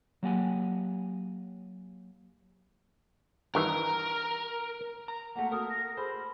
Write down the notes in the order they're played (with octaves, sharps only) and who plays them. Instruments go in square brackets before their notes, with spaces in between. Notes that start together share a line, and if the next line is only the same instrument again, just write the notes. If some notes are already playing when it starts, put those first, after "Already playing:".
[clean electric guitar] F#3 A#3 G4 F#5 G#5
[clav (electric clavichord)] G2 D#3 E3 [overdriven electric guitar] A#4
[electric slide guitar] A#5
[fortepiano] A3 A#3 [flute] F#5
[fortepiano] A#3 F#4 A4 [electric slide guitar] A#4 [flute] D#6
[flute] A#6
[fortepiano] G#4 A4 C5 [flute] B5